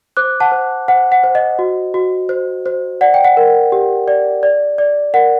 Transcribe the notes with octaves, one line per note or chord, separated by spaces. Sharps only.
C5 D6 F#6
F#5 A5
C5
C5 F#5
F#5
C5
D#5
F#4
F#4
C5
C5
D5 F#5
G5
F#5
A#4
G4
D5
D5
D5
A#4 F#5